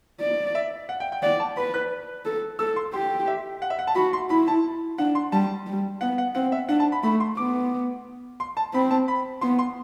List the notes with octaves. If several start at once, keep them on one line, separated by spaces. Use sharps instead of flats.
D5
E5
F#5
G5
G5
D5 F#5
A5
B4 B5
F#6
A4
A4 E6
C6
G4 C6
E5
F#5
E5
F#5
A5
F#4 B5
C6
E4 B5
A5
D4 F#5
C6
G3 A5
G3
B3 F#5
F#5
C4 F#5
E5
D4 F#5
A5
B5
A3 B5
C6
B3 D6
C6
A5
C4 B5
A5
B5
B3 C6
C6